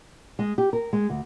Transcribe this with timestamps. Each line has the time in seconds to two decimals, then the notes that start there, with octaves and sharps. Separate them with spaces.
0.39 G#3
0.58 G4
0.73 A#4
0.93 G#3
1.09 D2